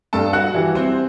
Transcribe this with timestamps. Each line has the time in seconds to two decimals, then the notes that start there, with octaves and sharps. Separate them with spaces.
0.13 G2 A4 A5
0.33 F#4 F#5
0.54 E3 G3
0.75 C4 C5